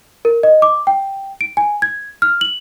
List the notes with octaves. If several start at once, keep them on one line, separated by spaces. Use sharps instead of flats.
A#4
D#5
D6
G5
D7
G#5
G#6
F6
F#7